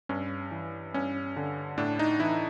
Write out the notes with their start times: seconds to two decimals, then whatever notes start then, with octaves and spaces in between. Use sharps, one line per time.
0.09 G2 C#4
0.51 E3
0.94 G2 C#4
1.37 D3
1.78 A2 D4
1.99 D#4
2.20 E3 E4